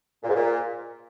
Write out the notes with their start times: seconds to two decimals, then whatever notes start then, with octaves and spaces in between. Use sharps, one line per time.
0.23 A#2
0.29 G#2
0.34 A#2